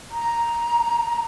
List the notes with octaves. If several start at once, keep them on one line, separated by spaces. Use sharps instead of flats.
A#5